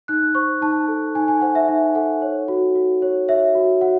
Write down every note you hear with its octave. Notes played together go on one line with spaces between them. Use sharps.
D#4 F#6
C5 C#6
D#4 A5
A4
D#4 G#5
G#5
C5 F#5
E5
D#4 E5
A4 F#5
C#5
F#4
F#4
C#5
C#5 E5
F#4
F#4 F#5